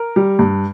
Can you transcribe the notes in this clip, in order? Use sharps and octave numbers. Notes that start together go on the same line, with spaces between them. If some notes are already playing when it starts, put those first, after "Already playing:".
Already playing: A#4
G3
G2